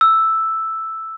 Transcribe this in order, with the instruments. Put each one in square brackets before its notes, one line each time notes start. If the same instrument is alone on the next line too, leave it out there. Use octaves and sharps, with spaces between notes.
[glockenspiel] E6